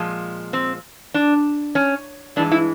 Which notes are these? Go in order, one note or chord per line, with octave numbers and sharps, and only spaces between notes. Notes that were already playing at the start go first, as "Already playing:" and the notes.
Already playing: A#2 F3 G#3
C4
D4
C#4
G2 E3 G#3 D4
E4